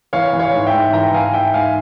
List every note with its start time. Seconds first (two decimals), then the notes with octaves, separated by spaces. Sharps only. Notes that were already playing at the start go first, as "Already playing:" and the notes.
0.13 E3 C#5 F5
0.33 E3
0.39 C#5 F5
0.54 G#2
0.67 E5 G5
0.73 G#2
0.93 E3 G5 A#5
1.13 E3 F5 G#5
1.33 G#2 E5 G5
1.54 G#2 F5 G#5